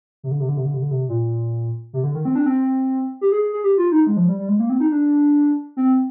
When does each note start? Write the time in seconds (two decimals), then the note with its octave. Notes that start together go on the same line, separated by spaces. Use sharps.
0.23 C3
0.31 D3
0.40 C3
0.48 D3
0.57 C3
0.65 D3
0.74 C3
0.82 D3
0.91 C3
1.09 A#2
1.93 C3
2.03 D3
2.15 D#3
2.25 C4
2.35 D4
2.46 C4
3.21 G4
3.32 G#4
3.43 G#4
3.53 G#4
3.64 G4
3.78 F4
3.92 D#4
4.07 G#3
4.17 F3
4.28 G3
4.39 G3
4.48 G#3
4.59 A#3
4.70 C4
4.80 D#4
4.91 D4
5.77 C4